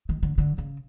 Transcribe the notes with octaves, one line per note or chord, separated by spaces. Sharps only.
D#3
D3
D3
C#3